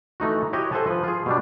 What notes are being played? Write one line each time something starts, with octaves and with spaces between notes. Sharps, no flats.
E3 A3 D#4 F#4
E4 F#4 G4 C#5 D#5
A4 C5 E5 F#5 G#5 A5
F3 B4
F4 G#4
B2 G3 D4